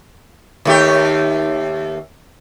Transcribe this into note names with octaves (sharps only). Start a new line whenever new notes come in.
D#2 A3 G4